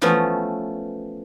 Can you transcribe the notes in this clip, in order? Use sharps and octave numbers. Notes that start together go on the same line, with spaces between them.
E3 F3 A3 B3 C#4